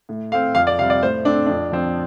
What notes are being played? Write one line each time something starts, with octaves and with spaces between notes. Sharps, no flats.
A2
A3 C4 F5
F2 F5
D5
C3 G3 C4 F5
D5
A2 C5
A3 C4 D4
F2 D4
F3 C4